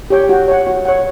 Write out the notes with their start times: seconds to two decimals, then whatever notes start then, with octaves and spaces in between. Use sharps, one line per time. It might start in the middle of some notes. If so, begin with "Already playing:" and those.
0.10 G4 C#5 G5
0.29 F#4
0.48 C#5 F#5
0.67 F#4
0.85 C#5 F#5